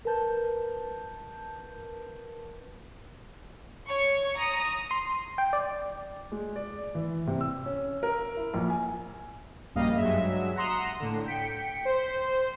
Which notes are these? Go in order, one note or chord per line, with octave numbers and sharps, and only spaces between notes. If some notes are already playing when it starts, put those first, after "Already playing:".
A#4 B4 A5 G6
C#5 C#6
A#5 D#6
C6
G5
D5
G#3
D5
E3
C3
E6
C#4
A#4
E4
A#1
G#5
A#1 F#2 G3 A#3 D#5 F5
G2 F#3 G#3 E5
F#5 A#5 C6 D#6 E7
A2 D3
G5 B6 C#7
C5